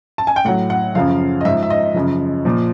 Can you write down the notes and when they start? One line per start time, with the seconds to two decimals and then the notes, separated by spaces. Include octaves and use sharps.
0.18 A5
0.27 G#5
0.36 G5
0.45 A2 F#3 F#5
0.70 F#5
0.95 F#2 C#3 F3 F5
1.41 D#5
1.45 G#2 F3 E5
1.63 E5
1.70 D#5
1.94 F#2 C#3 F3
2.45 A#2 F3